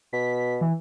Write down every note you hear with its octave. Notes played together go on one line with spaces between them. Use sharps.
B2 B6
E3